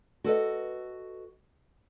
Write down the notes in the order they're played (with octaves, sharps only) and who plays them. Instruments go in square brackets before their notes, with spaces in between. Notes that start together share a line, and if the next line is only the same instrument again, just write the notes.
[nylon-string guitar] F#4 A4 B4 D#5